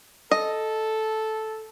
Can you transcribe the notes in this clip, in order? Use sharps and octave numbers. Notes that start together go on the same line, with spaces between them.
A4 D#5